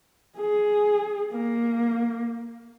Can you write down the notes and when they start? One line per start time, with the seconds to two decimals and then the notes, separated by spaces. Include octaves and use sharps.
0.38 G#4
1.33 A#3